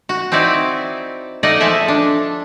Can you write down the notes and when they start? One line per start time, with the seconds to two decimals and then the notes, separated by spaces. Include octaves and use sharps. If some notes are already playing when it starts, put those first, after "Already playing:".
0.09 F#4
0.32 C4 D#4 E4 D5
1.43 A3 D#4 D5 D#5 F#5
1.60 F3 G#4 A4 E5
1.88 D4